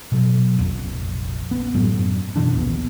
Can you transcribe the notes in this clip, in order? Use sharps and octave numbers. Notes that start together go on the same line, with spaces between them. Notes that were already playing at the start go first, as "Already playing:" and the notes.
B2 F#3
F1 A#1 F2
B3
F#2 A2 F#3
B2 E3 D4
D#1 A#1 B3